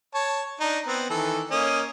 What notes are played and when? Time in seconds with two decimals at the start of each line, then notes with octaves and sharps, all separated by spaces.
0.14 C#5 A5
0.60 D4 D#4
0.87 B3 C4
1.10 D#3 E3 A4
1.51 A#3 C#4 D#5